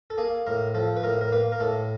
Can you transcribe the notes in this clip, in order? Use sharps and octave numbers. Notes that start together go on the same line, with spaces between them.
A4
A#3 G#4
A2 A#4
F3 A4
B4
A2 A#4
A#4
A#3 B4
A#4
A2 A4